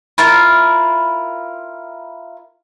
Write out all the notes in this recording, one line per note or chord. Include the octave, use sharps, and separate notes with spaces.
E4 F4 A#4